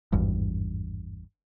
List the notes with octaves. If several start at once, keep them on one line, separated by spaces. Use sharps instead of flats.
G#1 E2 G2